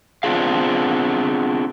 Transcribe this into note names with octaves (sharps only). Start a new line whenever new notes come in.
B3 C4 D4 F4 G#4 F5